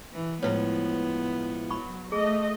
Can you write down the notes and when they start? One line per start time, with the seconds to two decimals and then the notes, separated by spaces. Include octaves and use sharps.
0.13 E3
0.43 A2 F3 G#3 B3 E4 B4 C#5
1.71 F#3 B5 C#6
2.12 A3 G#4 D#5